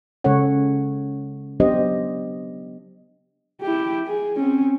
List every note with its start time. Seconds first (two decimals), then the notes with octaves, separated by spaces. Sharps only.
0.24 C#3 G#3 C#4 A4 C#5 F#5
1.60 F#3 B3 D4 G4 C5 D#5
3.62 E4 G4
4.06 G#4
4.36 C4 C#4